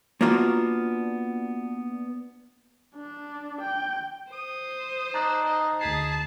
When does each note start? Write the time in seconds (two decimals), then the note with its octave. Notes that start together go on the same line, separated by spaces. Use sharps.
0.21 A#3 B3 D4 F4 F#4
2.96 D4
3.62 G5
4.33 C5 D#6
5.14 D#4 D5 A5 A#5 F#6
5.45 D#5
5.81 D2 G#4 A5 B6 C7